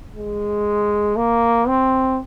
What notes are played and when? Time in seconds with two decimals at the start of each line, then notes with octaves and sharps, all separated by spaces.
0.15 G#3
1.17 A#3
1.67 C4